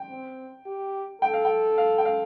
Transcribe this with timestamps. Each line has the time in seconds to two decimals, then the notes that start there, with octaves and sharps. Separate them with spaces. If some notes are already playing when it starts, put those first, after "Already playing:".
Already playing: G5
0.10 C4
0.66 G4
1.21 A4 G5
1.34 F5
1.45 G5
1.78 F5
1.98 G5
2.05 F5